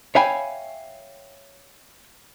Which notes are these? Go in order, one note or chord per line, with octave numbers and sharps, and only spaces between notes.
C#5 E5 F5 G5 G#5 B5